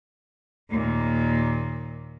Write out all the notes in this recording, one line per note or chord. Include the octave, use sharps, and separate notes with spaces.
D#2 A#2